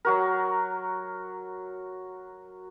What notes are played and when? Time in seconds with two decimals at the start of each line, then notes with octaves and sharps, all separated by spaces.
0.05 F#3 F#4 A#4